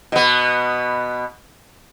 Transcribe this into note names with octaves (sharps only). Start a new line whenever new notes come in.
B2 B3